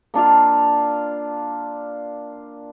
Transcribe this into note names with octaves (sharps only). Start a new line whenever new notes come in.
A#3 D4 F4 F5